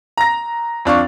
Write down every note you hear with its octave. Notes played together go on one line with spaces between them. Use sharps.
A#5 A#6
F2 D4 F5 C#6